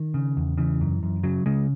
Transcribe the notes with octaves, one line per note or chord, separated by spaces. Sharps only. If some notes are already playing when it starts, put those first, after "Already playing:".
Already playing: D#3
C#3
E2
C#3 E3
F#2
F#2
C#3 F#3
C#3 G#3